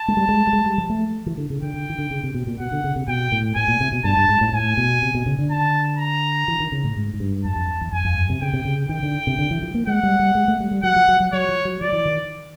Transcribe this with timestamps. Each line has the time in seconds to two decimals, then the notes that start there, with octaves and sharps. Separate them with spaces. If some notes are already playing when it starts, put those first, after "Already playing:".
Already playing: A5
0.08 G#3
0.17 G3
0.29 G#3
0.47 G3
0.53 G#3
0.66 G3
0.78 F3
0.90 A3
1.26 E3
1.37 D3
1.50 C#3
1.62 D3 G5
1.74 D3
1.90 D#3
1.98 D3
2.11 C#3
2.23 C3
2.34 B2
2.47 A#2
2.60 B2 F#5
2.72 D3
2.84 C#3
2.96 C3
3.08 B2 G5
3.32 A2
3.56 A2 G#5
3.68 A#2
3.80 C3
3.92 B2
4.04 G2 A5
4.17 G2
4.29 G#2
4.41 A2
4.53 A2 G#5
4.77 B2
5.02 C3
5.15 B2
5.26 C#3
5.39 D3
5.50 A5
5.99 A#5
6.48 E3
6.60 D#3
6.72 C#3
6.84 A2
6.96 G#2
7.14 G#2
7.20 G2
7.45 F#2 A5
7.56 F2
7.81 E2
7.93 F2 G#5
8.05 F2
8.18 F#2
8.29 C3
8.42 C#3 G5
8.53 C3
8.65 C#3
8.89 D#3 G5
9.03 D3
9.27 C3
9.39 D3
9.51 E3
9.63 F3
9.74 A#3
9.87 G#3 F#5
10.03 G3
10.19 G3
10.35 G#3
10.48 A3
10.60 G3
10.71 G3
10.83 F#3 F#5
10.96 F3
11.08 F#3
11.20 F#3
11.33 F#3 C#5
11.49 F3
11.65 F#3
11.81 F3 D5
11.93 E3
12.05 D#3